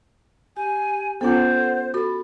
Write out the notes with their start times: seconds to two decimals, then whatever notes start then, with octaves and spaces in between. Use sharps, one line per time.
0.57 G4 G#5
1.21 B3 C#4 F4 A4 C5 F#5
1.94 F#4 A4 B5